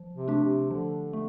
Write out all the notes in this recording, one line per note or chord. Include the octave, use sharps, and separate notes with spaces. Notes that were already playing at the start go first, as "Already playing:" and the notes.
Already playing: F3
C3
A3 D4 G4
C3
D3 F3
A3